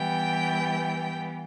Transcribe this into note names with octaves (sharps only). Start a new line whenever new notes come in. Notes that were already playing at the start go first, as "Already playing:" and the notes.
Already playing: E3 G3 B3 G5